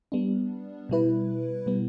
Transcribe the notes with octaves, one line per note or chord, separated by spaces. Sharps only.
G3 B3 D4
B2 G3 E4 B4
B2 G3 B3